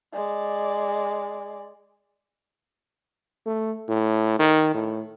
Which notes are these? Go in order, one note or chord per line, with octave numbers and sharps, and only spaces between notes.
G#3 D5
A3
A2
D#3
A2